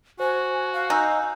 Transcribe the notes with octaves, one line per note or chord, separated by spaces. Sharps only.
F#4 C5 G#5
F5
D#4 G#5 E6 G6